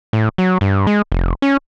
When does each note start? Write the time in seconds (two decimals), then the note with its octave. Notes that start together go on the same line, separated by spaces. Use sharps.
0.13 A2
0.38 F#3
0.61 G2
0.87 G#3
1.12 F1
1.42 C#4